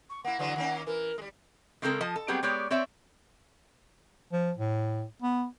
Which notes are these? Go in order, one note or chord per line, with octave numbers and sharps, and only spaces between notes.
C#6
A#3 E4 F#5
D3 E3 F#3
D#3 A#3 C#4
E3 A#4
G3 G#3
C#3 G#3 C4 C#4 A4 A#4
F3 D#5 A5
A4
F#3 G3 B3 C4 G4 G#4
G#3 B3 G4 C#5 D5
C4 C#5 D5 E5
F3
A2
B3